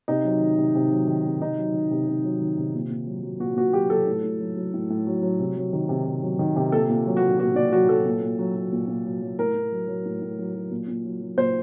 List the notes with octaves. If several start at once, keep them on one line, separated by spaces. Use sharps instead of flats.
C3 D#4
F#3
D#3
C3
C3
F#3
D#3
C3
C3 D#4
F#3
D#3
C3
C3
F#3
D#3
C3
A#2
A#2
F#3
F#3
A#2 F#4
A#2 F#4
F#3 G4
F#3 A4
A2
A2
F#3
F#3
A2
A2
F#3
F#3
C3
F#3
D#3
C3
C3
F#3
D#3
C3
A#2 A4
A#2
F#3
F#4
F#3
A#2 F#4
A#2 D5
F#3 F#4
F#3 A4
A#2
A#2
F#3
F#3
A#2
A#2
F#3
F#3
A2 A#4
A2
F#3
F#3
A2
A2
F#3
F#3
A#2
A#2
F#3
F#3
A#2 C5